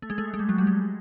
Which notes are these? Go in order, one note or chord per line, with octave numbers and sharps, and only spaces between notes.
A3
G#3
A3
G#3
G3
F#3
G3
G#3